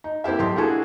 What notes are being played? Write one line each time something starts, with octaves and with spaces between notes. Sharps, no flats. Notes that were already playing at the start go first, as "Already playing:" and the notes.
D#4
A#3 C4 E4 G4 E5
B1 G4 G5 C6
A#3 D4 E4 F#4 G#4 A4